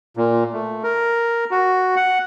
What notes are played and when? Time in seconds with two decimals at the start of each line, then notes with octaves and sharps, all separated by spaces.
0.17 A#2
0.53 A3
0.84 A#4
1.51 F#4
1.96 F#5